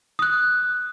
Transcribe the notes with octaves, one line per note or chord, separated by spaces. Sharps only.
D#6 F#6